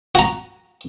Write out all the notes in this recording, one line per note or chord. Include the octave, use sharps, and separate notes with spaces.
F#4 A#5